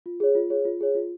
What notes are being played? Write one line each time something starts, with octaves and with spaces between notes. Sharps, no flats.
F4
G#4 C#5
F4
G#4 C#5
F4
G#4 C#5
F4